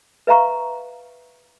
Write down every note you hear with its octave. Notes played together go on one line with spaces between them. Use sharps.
B4 E5 F5 A#5 C#6